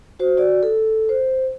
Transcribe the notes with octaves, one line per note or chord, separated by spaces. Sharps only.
F#4 C5
F#4 D5
A4
C5